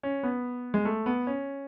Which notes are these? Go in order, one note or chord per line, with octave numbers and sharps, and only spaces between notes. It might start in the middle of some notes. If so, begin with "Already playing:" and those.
C#4
B3
G#3
A3
B3
C#4